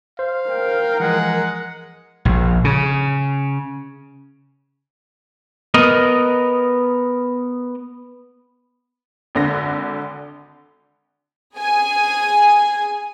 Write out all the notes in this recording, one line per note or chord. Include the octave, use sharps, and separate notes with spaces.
C5 F5
A#4 G5
E3 F3 G#3 F#5
A#1
C#3
B3 A#4 D#5
G#1 D3 A#6
G#4 G#5